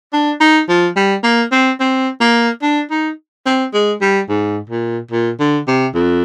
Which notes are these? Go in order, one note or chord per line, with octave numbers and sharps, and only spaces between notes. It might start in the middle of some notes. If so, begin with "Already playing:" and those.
D4
D#4
F3
G3
A#3
C4
C4
A#3
D4
D#4
C4
G#3
G3
G#2
A#2
A#2
D3
C3
F2